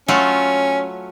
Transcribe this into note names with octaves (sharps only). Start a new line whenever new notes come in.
F#3 A3 C#4 F4